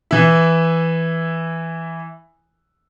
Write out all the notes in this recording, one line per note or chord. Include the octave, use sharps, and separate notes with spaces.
E3 E4